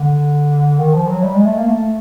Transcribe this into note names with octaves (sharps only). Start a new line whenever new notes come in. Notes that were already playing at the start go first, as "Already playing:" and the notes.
Already playing: D3
D#3
F3
F#3
G3
G#3
A3
A#3
A3